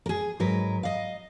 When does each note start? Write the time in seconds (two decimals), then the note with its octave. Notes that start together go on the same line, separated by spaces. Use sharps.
0.06 G#4 A#4
0.40 G#2 F#3 A#4 B4
0.83 D#5 F5